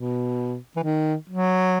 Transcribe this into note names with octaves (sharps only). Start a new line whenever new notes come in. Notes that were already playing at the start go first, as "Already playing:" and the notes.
Already playing: B2
E3
D#3
F#3